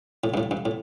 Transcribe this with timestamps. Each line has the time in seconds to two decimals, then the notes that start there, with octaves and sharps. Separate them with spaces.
0.24 A2
0.34 G2
0.37 A2
0.51 G2
0.65 A2